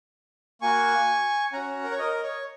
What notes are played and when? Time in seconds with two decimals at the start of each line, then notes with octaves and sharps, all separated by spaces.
0.61 A#3 F#4 G#5 C#6
1.53 C#4 F#4 F#5 A#5
1.84 A#4
1.91 C#5
1.99 A#4 D#5
2.14 D#5
2.23 C#5